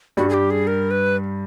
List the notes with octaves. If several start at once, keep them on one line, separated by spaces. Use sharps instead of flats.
G2 G3 F#4
G#4
G4
G#4
A#4
B4